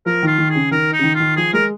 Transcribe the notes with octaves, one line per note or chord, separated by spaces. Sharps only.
F3 A#4
D#3 F4
D#3
G#4
C#3
D#3 A#4
D#4
C#3
D#3
D#3 F4
F3 G#4
G#3 A#4